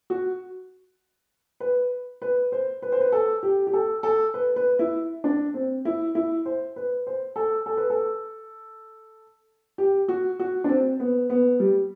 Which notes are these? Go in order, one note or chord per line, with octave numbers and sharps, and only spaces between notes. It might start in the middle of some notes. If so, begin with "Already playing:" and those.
F#4
B4
B4
C5
B4
C5
B4
A4
G4
G4
A4
A4
B4
B4
E4
D4
C4
E4
E4
C5
B4
C5
A4
A4
B4
A4
G4
F#4
F#4
D4
C4
B3
B3
G3